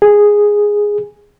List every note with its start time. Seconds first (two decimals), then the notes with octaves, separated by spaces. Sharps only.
0.02 G#4